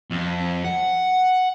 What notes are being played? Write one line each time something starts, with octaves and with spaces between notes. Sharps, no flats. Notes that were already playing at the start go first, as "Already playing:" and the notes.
F2
F#5